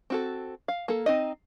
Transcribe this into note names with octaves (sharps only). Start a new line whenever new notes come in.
C4 F#4 A4
F5
A#3 A4
C4 D#4 D#5